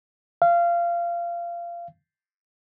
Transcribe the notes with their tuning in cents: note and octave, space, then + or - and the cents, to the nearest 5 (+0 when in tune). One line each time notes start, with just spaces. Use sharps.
F5 -20